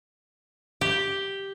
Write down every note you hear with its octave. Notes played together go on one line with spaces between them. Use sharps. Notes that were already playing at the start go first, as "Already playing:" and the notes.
G4